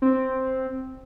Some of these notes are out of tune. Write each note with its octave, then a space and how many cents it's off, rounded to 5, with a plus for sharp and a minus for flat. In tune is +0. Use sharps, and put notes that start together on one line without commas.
C4 +0